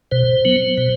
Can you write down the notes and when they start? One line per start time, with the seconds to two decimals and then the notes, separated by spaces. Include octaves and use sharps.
0.12 B2 C5
0.45 F#3 B3
0.78 B2